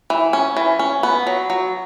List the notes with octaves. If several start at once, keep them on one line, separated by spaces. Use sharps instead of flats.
E3
C#4
E3
C#4
B3
F#3
F#3